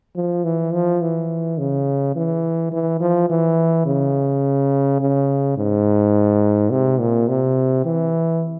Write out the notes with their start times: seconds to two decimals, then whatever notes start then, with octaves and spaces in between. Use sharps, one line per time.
0.15 F3
0.44 E3
0.73 F3
1.02 E3
1.58 C#3
2.16 E3
2.73 E3
3.00 F3
3.30 E3
3.86 C#3
5.01 C#3
5.57 G#2
6.72 C3
7.00 A#2
7.29 C3
7.85 E3